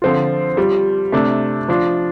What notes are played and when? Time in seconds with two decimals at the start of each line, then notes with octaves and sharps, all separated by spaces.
0.02 D3 F3 C4 F4
0.57 G3 F4
1.12 C3 A3 D4
1.68 F3 D4 F4